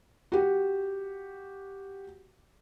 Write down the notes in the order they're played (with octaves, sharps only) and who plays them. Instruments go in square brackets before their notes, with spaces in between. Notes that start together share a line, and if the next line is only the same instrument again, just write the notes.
[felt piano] F#4 G4